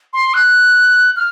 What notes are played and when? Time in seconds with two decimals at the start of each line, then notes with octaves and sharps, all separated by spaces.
0.13 C6
0.34 F#6
1.16 F6